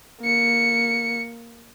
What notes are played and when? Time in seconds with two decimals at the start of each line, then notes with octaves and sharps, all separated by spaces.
0.21 A#3 C#7